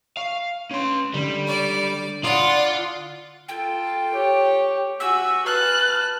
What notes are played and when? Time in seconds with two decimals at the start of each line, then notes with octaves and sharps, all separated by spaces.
0.17 F5 C#6
0.71 C#4 C6
1.14 D3 G3
1.47 D5
2.24 F4 D5 F#5 A5 B5 D#6
3.49 F4 A4 G5
4.14 G4 C#5
5.00 F#4 G#5 E6
5.46 B4 A5 F6 F#6